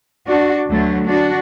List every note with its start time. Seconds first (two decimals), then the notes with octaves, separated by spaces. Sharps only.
0.29 D4 F#4
0.70 D2 D3 F#3 A3
1.09 D4 F#4